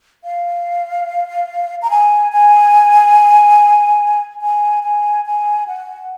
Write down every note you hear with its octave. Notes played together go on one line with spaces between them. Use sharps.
F5
A#5
G#5
G#5
G#5
G#5
G#5
F#5